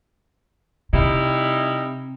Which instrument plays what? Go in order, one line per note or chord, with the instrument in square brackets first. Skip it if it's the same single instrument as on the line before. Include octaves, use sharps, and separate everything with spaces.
[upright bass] C3 [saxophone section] G3 D#4 E4